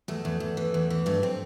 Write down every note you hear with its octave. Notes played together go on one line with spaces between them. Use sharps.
E2 A3
E2
E2
E3
E2
E3
G2 A3
C4